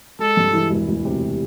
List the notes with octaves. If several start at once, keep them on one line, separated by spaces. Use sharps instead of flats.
G#3 A4
G2
E3
E1
D2
C3